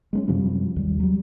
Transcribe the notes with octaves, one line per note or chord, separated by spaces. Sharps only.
G#3 A#3 C#4
F#2 C3 F3 G3
D#2 G3
F#3 G3